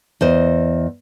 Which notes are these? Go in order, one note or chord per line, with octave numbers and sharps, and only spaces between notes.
E2 C5 D#5